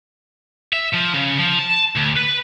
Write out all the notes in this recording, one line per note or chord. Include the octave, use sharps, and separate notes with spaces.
E5
F3
C#3
F3
A5
D2
B4